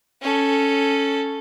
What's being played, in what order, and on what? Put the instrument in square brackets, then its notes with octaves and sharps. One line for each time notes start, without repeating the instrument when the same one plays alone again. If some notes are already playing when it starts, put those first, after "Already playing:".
[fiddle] C#4 A4